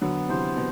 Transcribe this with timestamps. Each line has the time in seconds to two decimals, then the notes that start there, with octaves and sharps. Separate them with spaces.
0.01 D3 F#3 B3
0.29 C3 E3 C5
0.56 B2